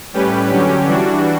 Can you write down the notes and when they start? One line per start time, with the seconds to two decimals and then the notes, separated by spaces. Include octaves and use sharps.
0.13 A2 G3 C#4 G4 B4
0.50 D3 F#3 C#4 G4
0.85 E3 G3 D4 F#4